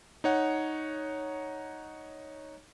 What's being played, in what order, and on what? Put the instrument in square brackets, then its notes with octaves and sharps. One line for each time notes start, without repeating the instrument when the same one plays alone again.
[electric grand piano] D#4 C#5 F#5